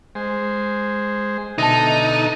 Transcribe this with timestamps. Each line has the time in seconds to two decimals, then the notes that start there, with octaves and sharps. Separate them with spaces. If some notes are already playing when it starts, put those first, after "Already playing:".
0.15 G#3 C5
1.58 B2 D3 D#4 A4 E5 A5